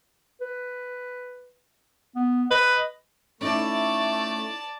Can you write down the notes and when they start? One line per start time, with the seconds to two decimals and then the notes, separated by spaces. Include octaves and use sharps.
0.41 B4
2.16 B3
2.51 B4 D#5
3.41 A3 C#4 D#4 E4 D5 A5 C#6